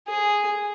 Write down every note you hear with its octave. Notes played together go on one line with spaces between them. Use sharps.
G#4